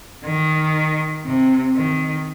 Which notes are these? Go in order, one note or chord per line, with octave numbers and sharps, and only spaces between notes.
D#3
C3
D#3